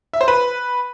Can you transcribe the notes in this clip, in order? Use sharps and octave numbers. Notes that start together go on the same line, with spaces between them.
E5
C5
B4